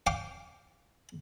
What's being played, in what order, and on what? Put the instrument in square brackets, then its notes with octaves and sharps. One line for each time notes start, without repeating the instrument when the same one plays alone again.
[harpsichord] F5 G5 D6